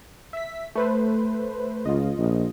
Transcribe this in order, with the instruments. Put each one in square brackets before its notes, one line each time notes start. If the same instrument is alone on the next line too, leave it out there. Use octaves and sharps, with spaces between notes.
[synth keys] E5 B6
A3 B4 C5
[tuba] C#2 [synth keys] F4 D#5
[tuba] A#1